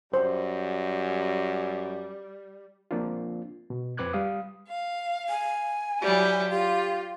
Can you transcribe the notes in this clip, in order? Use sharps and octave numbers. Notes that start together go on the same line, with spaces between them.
F#2 G3 C5
F3 A#3 C4 D4 F4
B2
F2 C4 B4 D6 F#6 G#6
G3 F5 D#6
F5
G#5
F#3 G3 E4
F4 G4